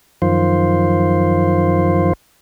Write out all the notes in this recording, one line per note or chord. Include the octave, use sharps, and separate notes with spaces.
F#2 D#3 F3 C5 F5